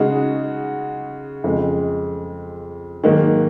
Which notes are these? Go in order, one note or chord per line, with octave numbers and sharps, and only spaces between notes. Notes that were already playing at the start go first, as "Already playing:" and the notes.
Already playing: C#3 G#3 D#4 F#4
F2 C#3 G#3
G#2 D#3 F#3 A#3